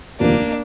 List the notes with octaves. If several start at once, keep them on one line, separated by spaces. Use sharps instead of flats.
F1 D#2 D3 F3 A#3 C4 D4